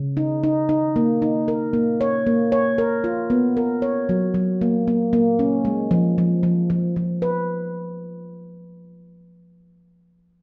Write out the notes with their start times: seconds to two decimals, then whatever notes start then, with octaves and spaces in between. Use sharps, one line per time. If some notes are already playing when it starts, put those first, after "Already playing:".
Already playing: C#3
0.17 D#4
0.43 D#4
0.69 D#4
0.96 A#3
1.22 D#4
1.48 A#4
1.73 A#3
2.01 C#5
2.27 A#3
2.52 C#5
2.78 A#4
3.04 F4
3.30 B3
3.57 A#4
3.82 C#5
4.09 F#3
4.34 F#3
4.61 A#3
4.88 A#3
5.13 A#3
5.39 C#4
5.65 G#3
5.91 F3
6.18 F3
6.43 F3
6.70 F3
6.96 F3
7.22 B4